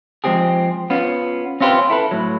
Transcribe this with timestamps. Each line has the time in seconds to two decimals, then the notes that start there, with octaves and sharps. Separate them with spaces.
0.24 F3 G#3 C4 G4 G#4
0.90 B3 C#4 F4
1.61 C4 C#4 F4 G4 B4
1.90 E4 A4 B4
2.11 A2 F#3